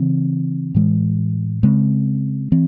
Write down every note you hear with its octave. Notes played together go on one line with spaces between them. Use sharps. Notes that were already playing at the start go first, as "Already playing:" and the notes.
Already playing: C#3 E3 C4
A2 E3 G#3
C#3 G#3 C4
E3 C4